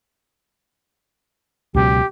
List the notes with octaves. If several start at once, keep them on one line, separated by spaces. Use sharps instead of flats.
C#2 B2 F#3 G4